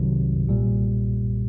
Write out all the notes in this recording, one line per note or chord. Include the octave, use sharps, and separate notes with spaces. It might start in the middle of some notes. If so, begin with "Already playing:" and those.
Already playing: C2 C3 D#3 F#3
B1 A#2 G3